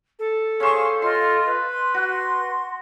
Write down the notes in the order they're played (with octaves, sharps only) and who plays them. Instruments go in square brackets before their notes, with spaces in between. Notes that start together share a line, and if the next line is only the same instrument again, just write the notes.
[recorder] A4
[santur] C#4 C5 [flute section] G#4 F5 C#6
[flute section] F4 D#5 [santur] C6
[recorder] B4
[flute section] C6
[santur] F#4